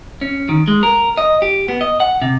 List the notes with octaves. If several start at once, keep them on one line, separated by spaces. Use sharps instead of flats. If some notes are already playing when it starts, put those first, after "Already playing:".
C#4
D#3
G#3
A#4
D#5
G4
B3
D#5
F#5
C3